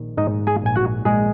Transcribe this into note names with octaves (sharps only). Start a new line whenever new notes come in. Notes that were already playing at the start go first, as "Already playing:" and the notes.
Already playing: A#1 D#3
G#2 D#4 D#5
G#4 G#5
A#1 G#5
F#4 F#5
A#1 G#3 G#4